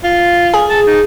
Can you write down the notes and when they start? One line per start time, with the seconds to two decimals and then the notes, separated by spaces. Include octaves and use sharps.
0.04 F4
0.54 G#4
0.70 A5
0.87 D#4